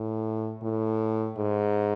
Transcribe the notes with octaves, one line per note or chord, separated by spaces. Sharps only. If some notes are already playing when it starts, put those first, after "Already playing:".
Already playing: A2
A2
G#2